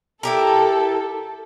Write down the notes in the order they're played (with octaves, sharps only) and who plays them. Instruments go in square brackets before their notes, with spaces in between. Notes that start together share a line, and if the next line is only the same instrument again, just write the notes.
[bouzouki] E4 G4 A#4 [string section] A4